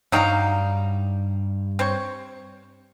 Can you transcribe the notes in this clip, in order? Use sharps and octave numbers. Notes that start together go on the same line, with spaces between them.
G2 F#3 G3 D#4 F5 G5 A#5
C4 C5 C#5